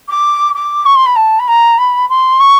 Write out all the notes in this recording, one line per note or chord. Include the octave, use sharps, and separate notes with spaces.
D6
D6
C#6
C6
B5
A5
B5
A#5
B5
C6
C#6